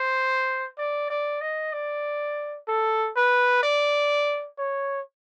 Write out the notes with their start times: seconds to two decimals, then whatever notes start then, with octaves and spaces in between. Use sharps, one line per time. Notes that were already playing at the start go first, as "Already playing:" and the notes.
Already playing: C5
0.78 D5
1.10 D5
1.41 D#5
1.73 D5
2.68 A4
3.16 B4
3.63 D5
4.58 C#5